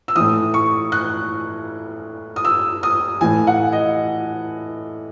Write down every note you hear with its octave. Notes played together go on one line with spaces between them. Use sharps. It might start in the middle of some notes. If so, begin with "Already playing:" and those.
E6
A2 E3 D#6
C#6
F#6
D#6
E6
D#6
A2 E3 G#5
F#5
D#5